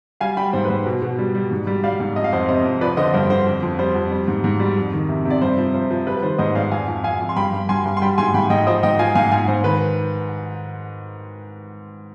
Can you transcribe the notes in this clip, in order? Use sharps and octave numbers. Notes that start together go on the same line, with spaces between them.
G3 F5 G#5
G3 G5 B5
G#2 C5
B4
G#2 C5
B2
B2
G3
G3
G#2
G3
G3 D5 F5
G#2
F2 D#5
F5
F2 C5 D#5
C3 C5 D#5
F2
F3 B4 D5
D3 C5 D#5
G2 C5
D3 C5
F2
F2
G3 C5
F2
G3
G#2
G#2
G3
F2
D#3
C3
C3
D5
G2 C5
F3
F3 C5
F3
G3 B4
B4
D#3 C5
G#2 C5 D#5
G#2 D5 F5
F2 F5 G#5
F2
F2 F5 G#5
F2
C6
G2 G5 B5
G2
G2 G#5 C6
G2
C6
G3 G5 B5
G#2 G#5 C6
G#2 G5 B5
G#2 D#5 G5
F3 C5 D#5
G#2 D#5 G5
F3 F5 G#5
G#2 F5 G#5
G#2 F5 G#5
G#2 C5
D#3 B4